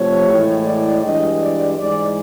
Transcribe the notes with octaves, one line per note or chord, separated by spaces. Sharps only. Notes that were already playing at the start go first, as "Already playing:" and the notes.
Already playing: C3 F3 A3 C#5
A2 E3 G#3
D5
G2 E3 G#3 D#5
D5
G#2 E3 G#3 D5